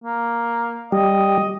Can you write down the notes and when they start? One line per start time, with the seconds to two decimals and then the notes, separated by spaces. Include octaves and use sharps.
0.04 A#3
0.92 G3 D#5